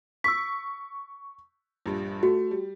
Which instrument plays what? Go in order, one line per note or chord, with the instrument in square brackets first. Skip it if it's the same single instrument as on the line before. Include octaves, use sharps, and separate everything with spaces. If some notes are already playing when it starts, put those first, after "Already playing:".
[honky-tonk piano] C#6 [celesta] E6 B6
[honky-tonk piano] A#1 G2
[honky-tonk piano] A3 [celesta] F#4
[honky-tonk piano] G3